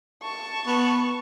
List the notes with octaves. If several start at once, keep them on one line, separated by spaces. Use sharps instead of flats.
A5 C#6
B3